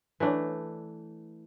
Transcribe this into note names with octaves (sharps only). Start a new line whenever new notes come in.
E3 A3 D4